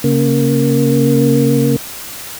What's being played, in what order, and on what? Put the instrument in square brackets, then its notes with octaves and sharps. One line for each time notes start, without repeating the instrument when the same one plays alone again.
[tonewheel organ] C#3 A#3